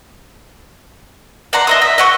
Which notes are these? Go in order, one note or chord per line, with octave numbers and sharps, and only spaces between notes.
D5 F#5 A#5 C6
D#5 E5 D#6
E5
D#5 F#5 C#6